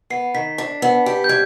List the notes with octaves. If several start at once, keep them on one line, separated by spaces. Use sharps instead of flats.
B3 C7
D#3 B6
D4
B3
G4
G6
G3 G#6